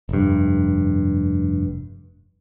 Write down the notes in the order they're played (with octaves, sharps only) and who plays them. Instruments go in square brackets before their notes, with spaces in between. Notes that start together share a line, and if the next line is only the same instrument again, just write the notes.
[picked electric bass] F1 G2